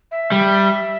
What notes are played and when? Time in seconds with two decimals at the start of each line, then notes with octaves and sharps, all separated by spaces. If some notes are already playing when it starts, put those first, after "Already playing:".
0.11 E5
0.32 G3